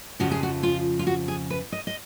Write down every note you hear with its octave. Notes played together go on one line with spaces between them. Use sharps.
F2 C#3 F3 F#4
G#4
F#4
F4
F4
F#4
G#4
B4
D#5
D#5